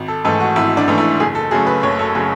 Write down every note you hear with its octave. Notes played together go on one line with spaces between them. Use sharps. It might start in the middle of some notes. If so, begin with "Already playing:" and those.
Already playing: G#1
A4
G#2 E3 A3 A4
F#4
G#1 E4
D4
G#2 E3 A3
E4
F#1 G#4
A4
F#2 C#3 F#3 A3 G#4
B4
F#1 C#5
A4
C#3 F#3 A3 G#4